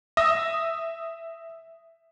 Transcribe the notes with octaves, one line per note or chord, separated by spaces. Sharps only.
E5 D#6 E6 A#6